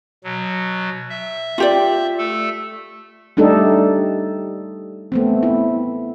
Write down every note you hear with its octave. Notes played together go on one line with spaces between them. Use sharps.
B2 F#3
E5
F4 G4 D5
A3 A4
G3 A3 D4 D#4 G4 A4
A3 B3 C4
E4